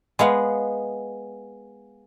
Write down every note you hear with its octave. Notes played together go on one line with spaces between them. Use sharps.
G#3 B3 F5 F#5